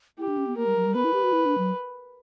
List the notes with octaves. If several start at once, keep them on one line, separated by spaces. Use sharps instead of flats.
E4 G4
D4
C#4
B3
A#3 A#4
G3
F#3
G3
B3 B4
E4
G4
F#4
E4
D4
F#3